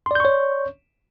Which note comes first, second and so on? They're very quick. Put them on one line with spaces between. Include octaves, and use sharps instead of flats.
C6 D5 G6 C#6 C#5